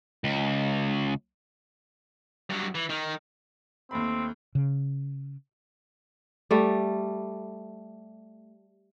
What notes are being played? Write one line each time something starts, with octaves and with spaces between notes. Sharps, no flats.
C#2
G2 F#3
E3
D#3
D#2 A3 C4 B5
C#3
G3 A3